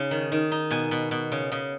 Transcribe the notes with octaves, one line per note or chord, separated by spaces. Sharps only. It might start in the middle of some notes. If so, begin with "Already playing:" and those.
Already playing: C#3 D#4
D#3
D#3
D#4
B2 G#5
B2
B2
C#3
C#3